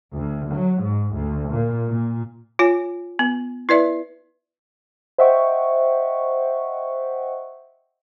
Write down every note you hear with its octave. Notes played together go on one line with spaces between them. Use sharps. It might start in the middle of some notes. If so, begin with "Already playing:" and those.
D2
F#3
G#2
D2
A#2
A#2
F4 C#5 G#5
B3
E4 B4 D5 E5
C5 D#5 E5 F#5 G5 C#6